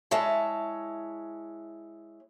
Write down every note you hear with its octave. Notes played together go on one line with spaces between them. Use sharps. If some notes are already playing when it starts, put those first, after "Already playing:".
G#3 E4 C#5 A5